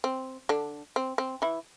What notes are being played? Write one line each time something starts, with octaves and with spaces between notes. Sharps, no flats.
C4
D3 D4
C4
C4
E3 E4